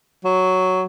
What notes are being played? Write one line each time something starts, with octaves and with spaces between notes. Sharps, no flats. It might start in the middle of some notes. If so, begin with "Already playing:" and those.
F#3